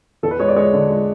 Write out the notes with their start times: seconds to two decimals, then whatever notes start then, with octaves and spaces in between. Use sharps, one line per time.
0.23 E2 A4
0.31 B4
0.39 G#3 C#5
0.48 D5
0.56 G#3 C#5
0.73 D3
0.90 G#3